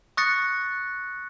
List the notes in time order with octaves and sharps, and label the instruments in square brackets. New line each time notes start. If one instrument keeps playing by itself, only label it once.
[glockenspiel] C#6 D#6 F#6 A6 A#6 C#7